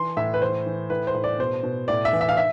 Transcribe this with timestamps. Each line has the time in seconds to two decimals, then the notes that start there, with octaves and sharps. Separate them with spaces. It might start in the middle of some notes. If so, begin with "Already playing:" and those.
Already playing: E3 C6
0.17 A2 E5
0.34 B4
0.41 E3 C5
0.66 E3
0.90 A2 B4
1.07 C5
1.14 A2
1.24 D5
1.39 B2 C5
1.63 B2
1.88 A2 D5
2.05 E5
2.13 E3
2.21 E5
2.29 F5
2.37 E5